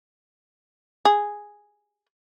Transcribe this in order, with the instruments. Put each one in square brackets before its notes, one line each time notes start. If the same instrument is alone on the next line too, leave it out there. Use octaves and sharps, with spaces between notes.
[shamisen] G#4